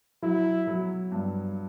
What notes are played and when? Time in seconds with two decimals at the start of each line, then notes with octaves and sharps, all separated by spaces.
0.22 F#3 E4
0.67 F#3
1.12 G2